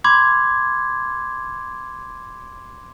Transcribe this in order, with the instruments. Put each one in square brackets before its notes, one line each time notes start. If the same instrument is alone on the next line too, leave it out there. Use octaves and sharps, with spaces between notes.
[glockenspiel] B5 C6 D6 G#6